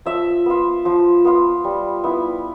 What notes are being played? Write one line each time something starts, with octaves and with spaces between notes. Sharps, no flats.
F3 E5
B3 F4
F3
B3 F4
G3
B3 E4